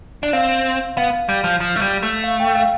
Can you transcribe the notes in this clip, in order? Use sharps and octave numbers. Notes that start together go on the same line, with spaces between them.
D4
C4 F5
B3 F5
G3
F3
F3
A3
G3
A3
F5
G5
F5